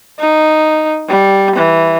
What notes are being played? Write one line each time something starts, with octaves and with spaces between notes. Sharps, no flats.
D#4
G3
E3